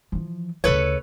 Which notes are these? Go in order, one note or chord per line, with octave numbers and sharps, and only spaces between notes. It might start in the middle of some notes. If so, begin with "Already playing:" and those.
E3 F3
D2 C#3 A4 B4 C#5